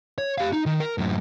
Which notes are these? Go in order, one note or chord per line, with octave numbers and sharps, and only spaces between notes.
C#5
G4 F5
D#4
D#3
A#4
F#2 A2